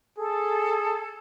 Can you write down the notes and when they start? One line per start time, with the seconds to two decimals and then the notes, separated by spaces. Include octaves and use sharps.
0.18 G#4 A4